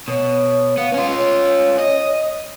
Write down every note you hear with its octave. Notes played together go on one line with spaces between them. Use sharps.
B2 C#5
B3 F5
C#4 F4
C#5
D#5